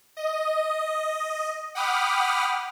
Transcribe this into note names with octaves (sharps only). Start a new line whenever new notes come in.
D#5
F#5 G5 B5 D6 D#6 F6